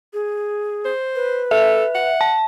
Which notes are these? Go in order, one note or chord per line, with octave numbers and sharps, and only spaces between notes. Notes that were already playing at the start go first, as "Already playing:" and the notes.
G#4
C5
B4
A4 E5
F#5
A5